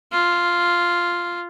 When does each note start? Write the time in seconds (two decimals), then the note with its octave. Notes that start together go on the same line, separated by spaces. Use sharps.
0.12 F4